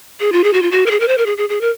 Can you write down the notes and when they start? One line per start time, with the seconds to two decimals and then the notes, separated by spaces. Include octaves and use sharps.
0.20 G#4
0.32 F4
0.44 G#4
0.53 F#4
0.62 F4
0.71 F#4
0.86 A#4
0.91 G#4
1.00 A#4
1.08 C5
1.18 A#4
1.26 G#4
1.38 G#4
1.49 G#4
1.61 A#4